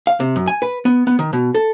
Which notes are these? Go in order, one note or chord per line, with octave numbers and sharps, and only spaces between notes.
F5
C3
F#2
G#5
B4
B3
B3
D#3
B2
A4